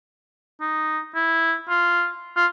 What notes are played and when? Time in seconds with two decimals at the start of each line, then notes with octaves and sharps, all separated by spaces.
0.61 D#4
1.15 E4
1.69 F4
2.37 F4